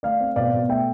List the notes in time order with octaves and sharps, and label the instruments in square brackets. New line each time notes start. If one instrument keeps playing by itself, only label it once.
[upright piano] A3 D5 F5
C4
B2 D5 F5
B2
A3 E5 G5